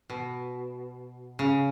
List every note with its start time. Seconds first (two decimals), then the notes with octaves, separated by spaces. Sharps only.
0.10 B2
1.39 C#3